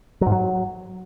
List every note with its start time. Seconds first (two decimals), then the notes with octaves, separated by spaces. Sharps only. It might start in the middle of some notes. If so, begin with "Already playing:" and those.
0.21 F#3
0.26 G#2
0.32 F#3